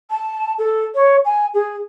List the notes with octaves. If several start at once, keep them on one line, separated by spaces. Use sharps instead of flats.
A5
A4
C#5
G#5
G#4